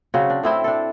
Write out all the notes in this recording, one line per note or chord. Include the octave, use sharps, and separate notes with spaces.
C#3 F#3 C4 F#4
D4
A2 C4 E4 C5
D4 A4